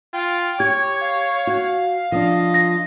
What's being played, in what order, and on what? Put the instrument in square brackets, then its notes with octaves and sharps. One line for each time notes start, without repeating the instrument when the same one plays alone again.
[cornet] F4 [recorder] G5
[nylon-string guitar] G4 [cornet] C#5 [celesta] G#6
[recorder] F5
[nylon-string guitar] F#4
[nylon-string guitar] F3 D4 [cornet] D#5
[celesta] A#6